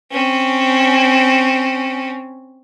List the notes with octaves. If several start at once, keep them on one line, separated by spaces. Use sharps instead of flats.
C4 C#4